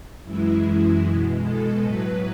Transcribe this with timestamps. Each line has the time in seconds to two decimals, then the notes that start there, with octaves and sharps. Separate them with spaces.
0.24 F#2 E3 G#3 E4
1.02 B2 G#3
1.42 A4
1.81 A2 F#3 B4